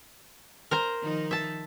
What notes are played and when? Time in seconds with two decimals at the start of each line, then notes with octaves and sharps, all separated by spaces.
0.71 A#4 C5 A#5
1.02 D#3 F3 D#4
1.31 E5 A5